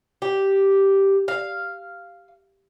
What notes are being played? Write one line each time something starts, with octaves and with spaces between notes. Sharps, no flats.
G4
F5